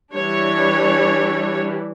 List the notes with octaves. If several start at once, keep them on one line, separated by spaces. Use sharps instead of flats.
E3 G3 D4 C#5